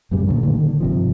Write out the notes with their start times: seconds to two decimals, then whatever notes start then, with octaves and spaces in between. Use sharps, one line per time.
0.11 F#2 A2 C#3 G3
0.27 A#2 D3 A3
0.43 D3 D#3 A#3
0.80 G1 C3 F3